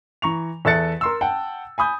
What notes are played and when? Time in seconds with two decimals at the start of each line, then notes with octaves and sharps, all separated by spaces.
0.22 E3 A#5 C#6 F7
0.65 E2 A4 E5 F#6 A6 C#7
1.01 A#4 C6 E6
1.21 F#5 G5 A5
1.78 G#5 B5 D#6 G6